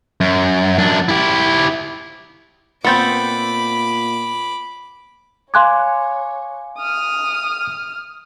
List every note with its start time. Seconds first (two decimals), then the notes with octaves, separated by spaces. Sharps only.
0.21 F#2
0.78 F#2 D4
1.09 E4 G4
2.85 A#2 B3 C4 B5 D6 G6 A6 C#7
5.54 C#5 F5 G#5 C6 D6 F#6 G#6
6.79 D#6 F6